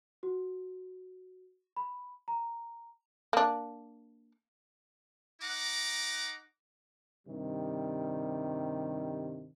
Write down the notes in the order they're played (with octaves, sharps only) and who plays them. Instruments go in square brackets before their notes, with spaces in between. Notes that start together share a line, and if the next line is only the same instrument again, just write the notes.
[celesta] F#4
B5
A#5
[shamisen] A#3 D4
[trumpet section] D#4 F#5 A#5 D6
[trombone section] G2 C3 D#3 G3